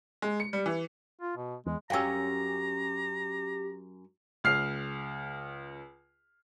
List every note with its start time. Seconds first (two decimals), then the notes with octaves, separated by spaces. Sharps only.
0.22 G#3
0.40 C#7
0.53 G3
0.66 E3
1.22 F4
1.37 B2
1.66 E2 G#3
1.90 F#2 C#4 G4 F5 G5 A#5 E6
4.44 C#2 F6 C7